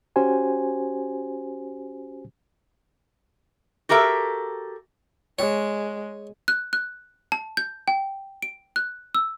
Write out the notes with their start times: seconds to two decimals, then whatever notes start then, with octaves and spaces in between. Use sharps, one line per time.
0.16 C#4 F#4 G4 C5 G#5
3.89 F#4 G4 A4 A#4 E5
5.39 G#3 C#5
6.48 F#6
6.73 F#6
7.32 A5
7.57 G6
7.88 G5
8.42 D7
8.76 F#6
9.15 E6